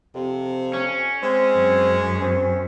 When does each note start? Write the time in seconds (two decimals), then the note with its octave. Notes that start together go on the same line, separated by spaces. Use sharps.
0.15 F2 C3
0.73 C#4
1.23 G#3 C4
1.56 F#2
2.21 C4